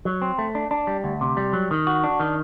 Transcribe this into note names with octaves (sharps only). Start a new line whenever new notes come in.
F#3
C4
A3
D4
D4
G3
D2
C3
G3
F#3
D#3
F#4
D4
D#3